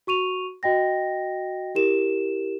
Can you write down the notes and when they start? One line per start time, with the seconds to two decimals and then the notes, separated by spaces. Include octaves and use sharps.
0.07 F#4 C#6 D#7 F7
0.63 F#4 D#5 G5 A#6
1.75 E4 G4 A#4 E7